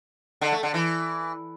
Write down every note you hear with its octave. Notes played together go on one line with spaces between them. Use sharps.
D3
A3
D3
E3